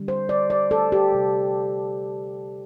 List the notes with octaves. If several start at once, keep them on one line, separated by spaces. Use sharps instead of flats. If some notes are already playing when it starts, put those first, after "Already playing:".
Already playing: D3 G3
C5
D5
D5
A4
G4
C3 G3